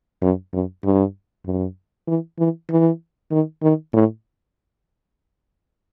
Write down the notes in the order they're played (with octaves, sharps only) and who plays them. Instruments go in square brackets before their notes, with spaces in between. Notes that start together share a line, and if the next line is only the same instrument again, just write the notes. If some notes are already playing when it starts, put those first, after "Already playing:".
[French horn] F#2
F#2
G2
F#2
E3
E3
E3
D#3
D#3
A2